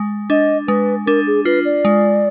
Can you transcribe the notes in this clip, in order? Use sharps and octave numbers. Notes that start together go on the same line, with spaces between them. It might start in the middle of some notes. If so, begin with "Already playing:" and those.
Already playing: G#3
D4 D#5
G#3 B4
D4 A#4
G#4
F4 B4
D5
G#3